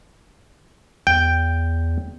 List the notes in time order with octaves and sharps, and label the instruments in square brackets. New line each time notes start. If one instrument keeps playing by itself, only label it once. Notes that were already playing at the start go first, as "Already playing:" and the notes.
[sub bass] E2 [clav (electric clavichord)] G5